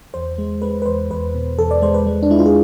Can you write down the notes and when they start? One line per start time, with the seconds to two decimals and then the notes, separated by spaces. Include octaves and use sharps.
0.14 E2 C5
0.38 G#3
0.62 G#3 B4
0.82 B4
0.86 E2 C5
1.10 E2 B4
1.34 B2
1.58 E2 A4
1.71 D5
1.82 G#3 C5
1.94 B4
2.07 G#3
2.23 D4
2.30 G#3 E4
2.39 F4
2.46 G#4